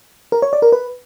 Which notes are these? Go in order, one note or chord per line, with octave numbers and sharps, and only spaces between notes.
A#4
C#5
D5
A#4
B4